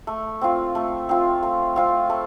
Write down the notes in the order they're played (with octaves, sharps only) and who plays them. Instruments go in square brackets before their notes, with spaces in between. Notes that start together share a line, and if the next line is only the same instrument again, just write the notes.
[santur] A3
C4 F4
A3
C4 F4
A3
C4 F4
A3